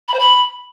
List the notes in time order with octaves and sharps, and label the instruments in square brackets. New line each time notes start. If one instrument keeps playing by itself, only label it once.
[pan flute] B5
C5
B5